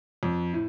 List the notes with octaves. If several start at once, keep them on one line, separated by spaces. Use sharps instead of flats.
F2
A2